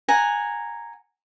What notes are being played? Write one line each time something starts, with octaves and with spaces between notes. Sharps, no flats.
F#5 G#5 A#5